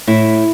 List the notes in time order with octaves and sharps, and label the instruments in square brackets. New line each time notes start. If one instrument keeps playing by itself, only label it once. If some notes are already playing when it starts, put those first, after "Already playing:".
[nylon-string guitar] A2 E4